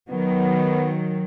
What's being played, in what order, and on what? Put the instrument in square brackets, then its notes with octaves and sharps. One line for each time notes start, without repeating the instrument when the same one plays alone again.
[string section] D#3 F#3 [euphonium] B3